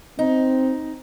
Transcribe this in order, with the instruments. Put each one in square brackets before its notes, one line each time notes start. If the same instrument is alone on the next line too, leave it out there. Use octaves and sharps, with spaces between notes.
[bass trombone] C4 [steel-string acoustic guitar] D#4